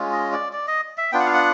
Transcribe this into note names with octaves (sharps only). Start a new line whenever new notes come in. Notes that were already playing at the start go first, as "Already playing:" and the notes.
Already playing: G#3 C#4 F4
D#5
D5
D5
D#5
E5
B3 D4 F4 G5
F#5
F5
F#5